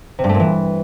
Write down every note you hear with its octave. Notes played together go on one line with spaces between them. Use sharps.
C3
G2
A3
A#2
E3